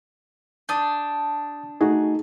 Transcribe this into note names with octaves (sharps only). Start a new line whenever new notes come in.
D4 A5 D#6 G6
A3 D#4 F#4 G#4